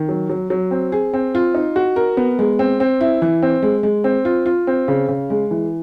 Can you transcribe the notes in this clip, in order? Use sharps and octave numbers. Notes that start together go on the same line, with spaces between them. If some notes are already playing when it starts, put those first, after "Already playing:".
Already playing: D#3
F#3
F#3
F#3
C4
G#4
C4
F4
D#4
F#4
A#4
B3
G#3
C4
C4
E4
E3
C4
G#3
G#3
C4
F4
F4
C4
C#3
C#3
G#3
E3